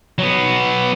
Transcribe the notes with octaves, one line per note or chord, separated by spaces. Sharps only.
F#3 B3